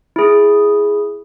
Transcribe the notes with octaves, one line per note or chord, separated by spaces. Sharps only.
E4 G#4